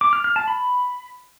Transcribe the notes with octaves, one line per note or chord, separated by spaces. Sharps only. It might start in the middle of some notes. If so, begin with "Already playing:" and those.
D6
F6
F6
A5
B5